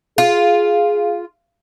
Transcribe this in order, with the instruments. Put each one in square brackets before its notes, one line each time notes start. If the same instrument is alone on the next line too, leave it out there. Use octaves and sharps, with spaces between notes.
[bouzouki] F4 [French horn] G#4